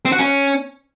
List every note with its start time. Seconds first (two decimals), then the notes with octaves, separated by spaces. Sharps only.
0.05 C4
0.12 F#4
0.19 C#4